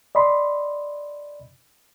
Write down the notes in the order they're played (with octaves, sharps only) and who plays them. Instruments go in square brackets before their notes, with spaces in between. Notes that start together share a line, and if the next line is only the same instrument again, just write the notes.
[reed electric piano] D5 D#5 B5 C6